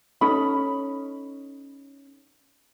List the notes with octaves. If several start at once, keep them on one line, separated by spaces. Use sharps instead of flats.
C#4 D#4 A4 B5